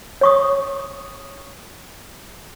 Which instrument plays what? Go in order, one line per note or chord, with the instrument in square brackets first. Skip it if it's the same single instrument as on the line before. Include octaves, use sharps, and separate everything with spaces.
[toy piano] C#5 C#6 D#6